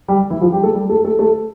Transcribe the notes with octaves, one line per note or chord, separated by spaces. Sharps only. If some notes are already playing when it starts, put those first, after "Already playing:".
G3 G4
E3 E4
F3 F4
G3 G4
A3 A4
G3 G4
A3 A4
A3 A4
A3 A4